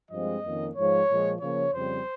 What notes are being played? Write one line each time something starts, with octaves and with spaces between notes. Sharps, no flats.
G2 F3 G#3 C4 D#5
F2 D#3 A#3 C#4
G#2 F3 G#3 C#5
A#2 F3 G#3
C#3 F3 A#3 C#5
F2 C#3 G3 C4 C5